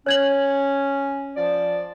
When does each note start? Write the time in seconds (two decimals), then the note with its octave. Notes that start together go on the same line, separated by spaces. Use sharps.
0.06 C#4 C#5 G#6 F#7
1.36 F3 D5